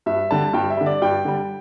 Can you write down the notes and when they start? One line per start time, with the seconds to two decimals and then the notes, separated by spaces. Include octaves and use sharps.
0.06 G2 E5
0.31 D3 G3 A5
0.53 G2 G5
0.70 E5
0.77 D3 G3
0.86 D5
1.02 G2 G5
1.25 D3 G3